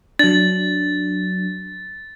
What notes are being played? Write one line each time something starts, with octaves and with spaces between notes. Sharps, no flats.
F#3 D4 A6